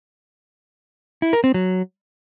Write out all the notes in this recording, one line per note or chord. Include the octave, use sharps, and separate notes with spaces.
E4
A#4
C4
F#3